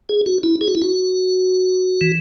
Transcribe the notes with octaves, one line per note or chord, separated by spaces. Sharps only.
G#4
F#4
E4
G#4
F#4
E4
F#4
E3